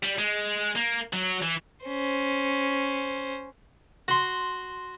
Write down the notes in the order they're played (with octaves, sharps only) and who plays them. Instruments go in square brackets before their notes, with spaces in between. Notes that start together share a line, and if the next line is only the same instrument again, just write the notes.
[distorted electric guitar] G3
G#3
A#3
F#3
E3
[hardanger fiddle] C#4 C5
[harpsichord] F#4 C6